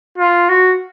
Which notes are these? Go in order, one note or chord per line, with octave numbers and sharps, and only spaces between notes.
F4
F#4